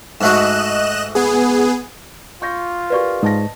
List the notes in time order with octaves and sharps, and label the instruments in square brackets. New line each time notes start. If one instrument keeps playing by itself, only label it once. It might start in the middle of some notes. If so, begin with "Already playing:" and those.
[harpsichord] G#2 A3 F#4 [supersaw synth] D#5 F#6 E7
[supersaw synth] B3 G#4
[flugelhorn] F4 [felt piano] C#6 G6 A#6
[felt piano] G4 A#4 F5 [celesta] B4 D5 C#6
[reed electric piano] G#2 [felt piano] D#5 A5 A#6